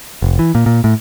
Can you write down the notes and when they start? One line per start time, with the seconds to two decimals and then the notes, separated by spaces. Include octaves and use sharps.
0.22 F1
0.39 E3
0.55 A#2
0.66 A#2
0.84 A2